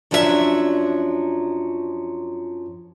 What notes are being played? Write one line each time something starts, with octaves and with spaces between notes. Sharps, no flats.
F#2 F3 F#3 D4 G4 E5